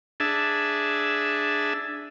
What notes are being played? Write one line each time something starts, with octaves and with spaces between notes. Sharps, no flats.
D4 G#4 E5 A5